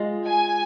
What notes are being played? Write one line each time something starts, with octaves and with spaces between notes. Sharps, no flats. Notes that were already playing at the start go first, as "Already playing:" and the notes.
Already playing: G#3 F4 D#5
G#5